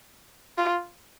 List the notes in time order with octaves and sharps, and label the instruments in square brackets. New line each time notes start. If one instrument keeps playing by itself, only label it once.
[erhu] F4